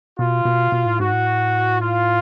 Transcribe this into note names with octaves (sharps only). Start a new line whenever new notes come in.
B2 F4
B2
B2
A2
G#2 F#4
A2
F4